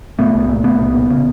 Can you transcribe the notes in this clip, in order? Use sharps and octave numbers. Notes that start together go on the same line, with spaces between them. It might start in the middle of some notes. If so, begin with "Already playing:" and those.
A#2 A3 B3
C2
A#2
C2 A3 B3
C2
A#2
C#3